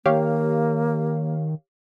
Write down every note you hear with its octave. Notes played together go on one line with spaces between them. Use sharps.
D#3 A#3 G4 C#5 F5